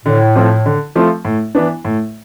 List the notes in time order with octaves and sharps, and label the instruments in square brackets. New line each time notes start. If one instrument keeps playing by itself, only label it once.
[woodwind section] A2 [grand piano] D3
[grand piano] F3 A3 C4 F4
D3
F3 A3 C4 F4
A2
E3 B3 D4
A2